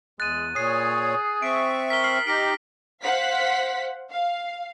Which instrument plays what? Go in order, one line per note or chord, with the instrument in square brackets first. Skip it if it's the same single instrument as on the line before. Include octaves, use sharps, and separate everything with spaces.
[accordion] E2 [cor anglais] G#3 [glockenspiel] F#6 D#7 [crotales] A6
[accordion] A#2 C#5 [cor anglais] G#4 [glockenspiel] D#6 C7
[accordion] C4 E5 C#6 [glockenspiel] D7
[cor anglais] A#4 [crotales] B6 G7
[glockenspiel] F6 C7 F#7
[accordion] D#4 G4 [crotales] A#6 B6 D7
[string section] C5 F5 F#5 B6
F5